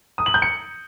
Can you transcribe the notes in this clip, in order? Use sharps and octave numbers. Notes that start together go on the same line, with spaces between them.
D#6
F#7
G6
C#7